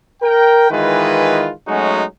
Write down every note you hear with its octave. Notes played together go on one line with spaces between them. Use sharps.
A#4 G5
D#3 E3 G#3 F4 B4
F#3 G#3 A3 C#4 D#4 F#4